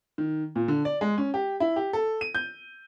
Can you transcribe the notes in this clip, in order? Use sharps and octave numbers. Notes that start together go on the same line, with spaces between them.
D#3
A#2
D3
D5
G#3
C#4
G4
E4
G4
A4
D#7
G6